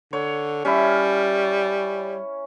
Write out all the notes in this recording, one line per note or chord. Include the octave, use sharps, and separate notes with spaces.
D3 C#5
G3 C#4 E4